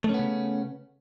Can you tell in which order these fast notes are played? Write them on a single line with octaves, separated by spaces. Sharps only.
A3 C#4 B3 C#3